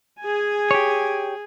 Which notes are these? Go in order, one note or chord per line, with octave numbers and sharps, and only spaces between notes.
G#4 G#5
G4 C#5